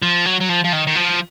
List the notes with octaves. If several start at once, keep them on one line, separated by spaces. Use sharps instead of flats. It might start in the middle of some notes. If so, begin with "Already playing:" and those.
F3
F#3
F#3
F3
F3
D#3
D#3
F3